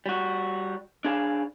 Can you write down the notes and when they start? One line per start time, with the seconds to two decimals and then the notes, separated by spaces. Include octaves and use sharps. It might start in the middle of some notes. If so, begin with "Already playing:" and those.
0.06 G3 F#4
1.05 D4 G#4 F5